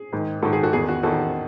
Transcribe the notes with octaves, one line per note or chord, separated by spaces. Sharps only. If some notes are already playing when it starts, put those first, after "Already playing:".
Already playing: G#4
G#2 D#3
G#2 D#3 F#4 A4
G#4
F#4 A4
E2 D#3 G#4
F#4
E2 D#3 F#4 A4